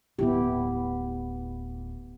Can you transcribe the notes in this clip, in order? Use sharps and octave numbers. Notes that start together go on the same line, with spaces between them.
D1 B3 E4 G4